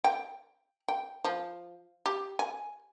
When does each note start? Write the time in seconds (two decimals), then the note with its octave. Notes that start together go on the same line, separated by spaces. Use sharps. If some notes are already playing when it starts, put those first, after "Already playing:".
0.04 G5
0.88 G5
1.24 F3
2.06 G4
2.39 G#5